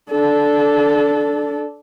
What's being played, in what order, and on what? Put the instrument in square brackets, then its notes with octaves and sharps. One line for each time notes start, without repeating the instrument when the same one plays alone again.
[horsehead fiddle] D4 A4